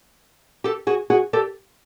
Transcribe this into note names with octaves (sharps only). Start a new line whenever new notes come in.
G4 A4
F#4 G#4
F#4 G#4
G4 A4